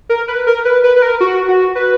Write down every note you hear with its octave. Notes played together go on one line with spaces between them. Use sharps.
A#4
B4
A#4
B4
B4
B4
A#4
F#4
F#4
B4